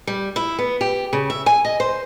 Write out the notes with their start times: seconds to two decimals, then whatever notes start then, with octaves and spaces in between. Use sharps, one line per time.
0.07 G3
0.36 E4
0.59 B3
0.81 G4
1.13 C#3
1.30 E5
1.46 G#5
1.65 D#5
1.80 C5